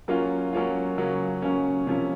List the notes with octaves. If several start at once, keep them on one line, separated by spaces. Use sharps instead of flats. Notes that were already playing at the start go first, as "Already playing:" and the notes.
F#3 A#3 C#4 F4
F#3 A#3 C#4 F4
C#3 F#3 A#3 C#4
C#3 F#3 A#3 C#4
C3 F3 A#3 C#4